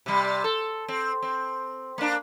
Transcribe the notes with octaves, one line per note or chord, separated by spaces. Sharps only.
C3 G3
A4
C4
C4
A#3 D4